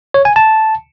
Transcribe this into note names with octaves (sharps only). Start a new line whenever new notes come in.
C#5
G#5
A5